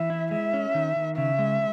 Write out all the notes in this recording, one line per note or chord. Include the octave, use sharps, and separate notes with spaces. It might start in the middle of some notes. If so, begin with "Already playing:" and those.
Already playing: E3 E5
E4
G#3 E5
C#4
D#3
D#3
C#3 E5
G#3